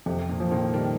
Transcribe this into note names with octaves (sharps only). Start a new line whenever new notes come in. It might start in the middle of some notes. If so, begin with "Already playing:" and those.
F2 C3
A#2
F3
A#2 D#3
D#3 G3